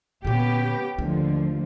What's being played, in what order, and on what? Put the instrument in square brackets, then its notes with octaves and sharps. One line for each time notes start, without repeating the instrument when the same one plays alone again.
[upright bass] A#2 D3 [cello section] B3 C#4 G4
[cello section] D#2 D3 F3 [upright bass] A3